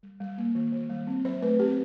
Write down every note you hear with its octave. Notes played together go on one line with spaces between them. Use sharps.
G3
G3
A#3
D#3
D#3
G3
C4
F#3 C5
A3 B4
C4 G4